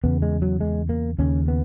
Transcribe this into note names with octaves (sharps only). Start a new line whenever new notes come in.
E2 C#3 B3
G#3
F#3
G#3
A#3
D#2 C#3 C#4
B3